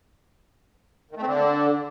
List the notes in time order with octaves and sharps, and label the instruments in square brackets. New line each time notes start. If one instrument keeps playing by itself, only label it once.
[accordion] D#3
A3
C4
D3